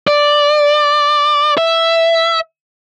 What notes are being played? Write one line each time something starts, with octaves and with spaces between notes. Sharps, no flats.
D5
E5